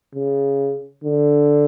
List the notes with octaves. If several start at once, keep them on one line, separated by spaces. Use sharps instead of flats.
C#3
D3